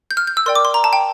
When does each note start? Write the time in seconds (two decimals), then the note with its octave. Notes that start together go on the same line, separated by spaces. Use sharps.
0.11 G6
0.17 F6
0.27 G6
0.37 E6
0.46 A#4 D5 G5 C6
0.55 D6
0.65 C6
0.74 A#5
0.84 A5
0.93 G5